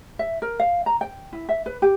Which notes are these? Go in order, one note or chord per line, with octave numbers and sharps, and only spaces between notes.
E5
A#4
F5
A#5
G5
E4
E5
B4
G4